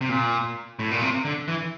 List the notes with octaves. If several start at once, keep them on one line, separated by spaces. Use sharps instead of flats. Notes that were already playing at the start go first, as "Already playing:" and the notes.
C3
A#2
A2
A#2
C3
D3
E3